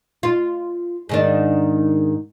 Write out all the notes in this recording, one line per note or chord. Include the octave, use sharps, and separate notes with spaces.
F4
G#2 D#3 D4